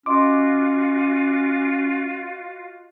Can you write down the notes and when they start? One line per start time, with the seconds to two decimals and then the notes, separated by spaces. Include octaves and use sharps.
0.06 C#4 F4 F#4 D#5 C6 D6